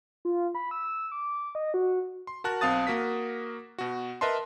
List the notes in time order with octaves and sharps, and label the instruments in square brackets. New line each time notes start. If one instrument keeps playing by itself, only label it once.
[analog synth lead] F4
B5
E6
D6
D#5
F#4
[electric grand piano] C6
F#4 A#4 A5 F#6
B1 C4 F5 A5 D#6 A6
A#3 F#4 A#4 D#6 B6
B2 F#4
A#4 B4 D#5 E5 A5 C6